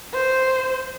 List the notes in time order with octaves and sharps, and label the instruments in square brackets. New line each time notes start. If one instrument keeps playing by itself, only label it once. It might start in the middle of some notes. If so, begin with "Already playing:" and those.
[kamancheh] C5